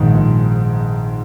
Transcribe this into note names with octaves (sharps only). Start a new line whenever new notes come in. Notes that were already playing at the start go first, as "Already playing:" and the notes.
Already playing: A#1 G#2 D#3
A#1